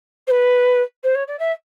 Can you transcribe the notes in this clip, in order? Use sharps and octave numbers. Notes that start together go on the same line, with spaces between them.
C5
B4
C5
C#5
D5
E5